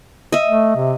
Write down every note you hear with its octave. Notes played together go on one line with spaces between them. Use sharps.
D#5 E5
A3
C3